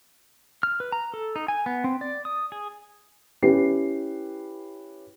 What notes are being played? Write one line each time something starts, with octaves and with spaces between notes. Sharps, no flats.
F6
B4
A#5
A4
D#4
G#5
B3
C4
D5
D#6
G#4
C#4 E4 G4 B4 C7